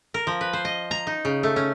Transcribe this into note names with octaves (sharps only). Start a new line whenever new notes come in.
A#4
F3
B4
C5
D#5
A#5
D#4
C#3
A3
C#4